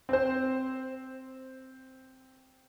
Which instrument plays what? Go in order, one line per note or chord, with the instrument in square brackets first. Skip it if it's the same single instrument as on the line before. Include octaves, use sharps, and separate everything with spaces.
[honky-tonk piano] C4 C5